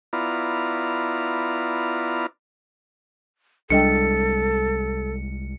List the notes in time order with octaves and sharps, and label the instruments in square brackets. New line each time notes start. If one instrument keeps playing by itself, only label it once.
[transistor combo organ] B3 E4 F4 D5 A#5 F6
[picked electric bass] C2 G3 G#3 [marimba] D4 D#5 G5 [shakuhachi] A4 [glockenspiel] C#7